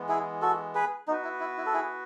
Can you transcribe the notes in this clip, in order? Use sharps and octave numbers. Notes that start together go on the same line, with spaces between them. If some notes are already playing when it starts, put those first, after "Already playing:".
Already playing: E3 G#3 B3
E4 G#4
F#4 A4
G#4 B4
B3 D#4 F#4 B4
E4
E4
E4
A4
E4 G#4